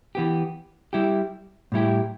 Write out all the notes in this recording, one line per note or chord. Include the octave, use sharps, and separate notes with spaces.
E3 B3 G4
G3 E4 G4
A2 G3 E4 G4